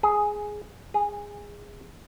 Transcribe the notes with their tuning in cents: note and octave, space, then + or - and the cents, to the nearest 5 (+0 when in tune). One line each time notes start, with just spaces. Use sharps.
G#4 +5
G#4 -15